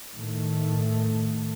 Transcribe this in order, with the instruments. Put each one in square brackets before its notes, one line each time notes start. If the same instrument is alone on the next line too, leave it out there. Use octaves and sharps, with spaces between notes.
[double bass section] A2 D#3 A3